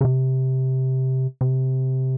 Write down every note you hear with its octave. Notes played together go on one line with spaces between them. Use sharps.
C#3
C3
C3